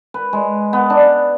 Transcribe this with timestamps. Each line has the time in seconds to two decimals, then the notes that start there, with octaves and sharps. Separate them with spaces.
0.14 B4
0.33 G#3
0.73 B3
0.90 D4